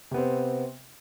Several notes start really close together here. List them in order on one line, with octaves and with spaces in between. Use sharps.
C3 B3 C4